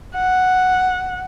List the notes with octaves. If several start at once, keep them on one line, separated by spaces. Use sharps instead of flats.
F#5